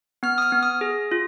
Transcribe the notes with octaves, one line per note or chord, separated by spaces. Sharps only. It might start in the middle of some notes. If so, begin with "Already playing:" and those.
B3 F6
D#6
F6
B3
D#6
G#4
F4